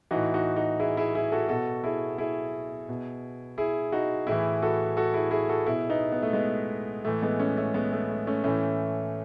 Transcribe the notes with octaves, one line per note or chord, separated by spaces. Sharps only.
A2 E3 D#4 F#4
D#4 F#4
D#4 F#4
E4 G#4
E4 G#4
E4 G#4
F#4 A4
B2 F#4 A4
E4 G#4
E4 G#4
B2
E4 G#4
D#4 F#4
A2 E3 E4 G#4
F#4 A4
F#4 A4
E4 G#4
E4 G#4
F#4 A4
B2 E4 G#4
B3 D#4
B3
A3
G#3 B3
A2 E3 A3
G#3 B3
A3 C#4
A3 C#4
G#3 B3
A3
A3
A3 C#4
A2 E3 A3 C#4